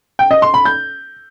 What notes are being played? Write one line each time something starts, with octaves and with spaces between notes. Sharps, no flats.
G5
D#5
C6
B5
G6